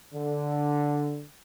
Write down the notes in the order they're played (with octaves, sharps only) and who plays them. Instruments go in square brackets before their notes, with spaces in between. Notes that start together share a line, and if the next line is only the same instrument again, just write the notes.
[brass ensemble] D3